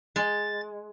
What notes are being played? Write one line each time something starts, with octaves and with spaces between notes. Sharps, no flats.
G#3 A6